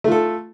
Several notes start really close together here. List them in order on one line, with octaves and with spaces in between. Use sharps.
A3 F4 A4